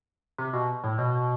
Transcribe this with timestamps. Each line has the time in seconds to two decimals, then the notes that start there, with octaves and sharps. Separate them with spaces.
0.38 C3
0.53 B2
0.84 A2
0.98 B2